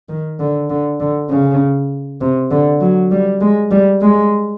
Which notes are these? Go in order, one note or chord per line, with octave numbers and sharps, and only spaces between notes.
D#3
D3
D3
D3
C#3
C3
D3
F#3
G3
G#3
G3
G#3